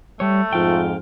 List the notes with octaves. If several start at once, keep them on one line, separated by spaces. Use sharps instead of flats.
G3 A3 C#5
F2 G#2 F3 F4 G5